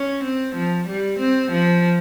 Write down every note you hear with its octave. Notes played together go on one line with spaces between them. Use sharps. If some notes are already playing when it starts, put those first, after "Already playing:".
Already playing: C#4
C4
F3
G3
C4
F3